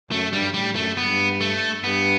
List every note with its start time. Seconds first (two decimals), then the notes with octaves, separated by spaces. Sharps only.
0.11 F#2 A3
0.33 G2 G3
0.54 A2 G3
0.75 F#2 A3
0.97 G2 B3
1.41 A3
1.84 G2 B3